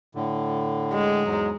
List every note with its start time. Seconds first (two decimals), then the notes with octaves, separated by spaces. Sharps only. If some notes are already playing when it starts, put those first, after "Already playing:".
0.15 A2 D3
0.93 G#3
1.25 E2 G#2 F#3